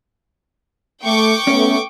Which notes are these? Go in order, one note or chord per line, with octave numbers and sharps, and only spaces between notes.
A3 G5 C#6 D6
A3 B3 C#4 C#5